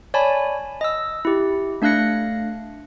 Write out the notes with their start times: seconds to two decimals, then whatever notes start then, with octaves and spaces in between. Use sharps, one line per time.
0.14 C#5 D5 G#5 A5 B5
0.81 D#5 E6
1.25 E4 G4
1.82 A3 D4 F5 F#6 A#6 C#7